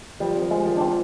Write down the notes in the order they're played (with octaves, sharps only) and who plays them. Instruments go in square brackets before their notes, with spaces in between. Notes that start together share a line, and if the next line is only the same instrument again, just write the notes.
[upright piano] F3 [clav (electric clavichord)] G3
[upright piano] C4
[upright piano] F3 [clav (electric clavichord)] G#3
[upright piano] F3
[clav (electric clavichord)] D4
[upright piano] F3 [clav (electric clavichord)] C4